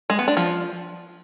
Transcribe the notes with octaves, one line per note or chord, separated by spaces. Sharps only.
G#3
B3
D4
F3